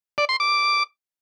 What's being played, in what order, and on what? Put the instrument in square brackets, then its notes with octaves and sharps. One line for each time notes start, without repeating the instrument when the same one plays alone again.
[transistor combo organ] D5
C6
D6